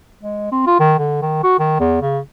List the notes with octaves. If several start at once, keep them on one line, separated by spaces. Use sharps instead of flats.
G#3
C4
F4
D#3
D3
D#3
F#4
D#3
E2
C#3